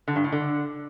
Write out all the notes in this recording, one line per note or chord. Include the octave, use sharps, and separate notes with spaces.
D3
G2
A2
D3